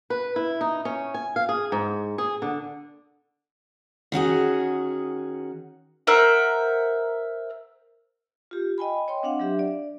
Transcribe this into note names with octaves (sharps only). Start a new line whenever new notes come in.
B4
E4
D#4
C#4
G#5
F5
G#4
G#2
G#4
D3
D#3 C#4 F#4 G#4
A#4 C5 E5 F#5
F4 G4
D#5 G5 G#5 B5
C#5 D#5 G5 C6
C4 D4 F5 F#5
F#3 D4 G4 E5
D5